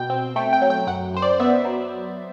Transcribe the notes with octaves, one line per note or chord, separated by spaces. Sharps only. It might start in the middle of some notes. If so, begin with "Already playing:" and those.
Already playing: B2 G5
C4
A3 G5
G5
F#3
G5
F#2 F#5
F#2 C5
D5
B3 E5
F#3